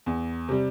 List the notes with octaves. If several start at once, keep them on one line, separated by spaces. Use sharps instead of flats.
E2
C3 G3